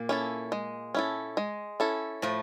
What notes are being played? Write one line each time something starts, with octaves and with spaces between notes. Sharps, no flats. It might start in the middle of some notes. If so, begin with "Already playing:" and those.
Already playing: A#2 A#3
C#4 E4 A4
G#3
C#4 E4 A4
G#3
C#4 E4 A4
A2 F3 A3